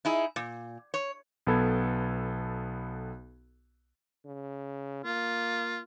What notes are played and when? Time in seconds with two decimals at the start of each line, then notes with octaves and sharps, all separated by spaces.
0.05 D#4 E4 G#4
0.36 A#2
0.94 C#5
1.47 B1 B3 A4 B5 G#6
4.26 C#3
5.05 A#3 F4